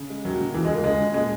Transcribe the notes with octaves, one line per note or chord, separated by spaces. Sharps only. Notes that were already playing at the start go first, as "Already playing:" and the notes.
Already playing: C#3
G#3
D#2 F#3
C#3
C#2 E3
G#3
C#2
A#3
C#2 G#3
C#3
A#2 G#3